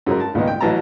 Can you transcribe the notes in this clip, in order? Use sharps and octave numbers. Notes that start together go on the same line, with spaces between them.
F#2 C#3 G#3 A#4
A5
C#2 A#2 D#3 B3 D#5
G5
A1 E3 F#3 D#5 A5 A#5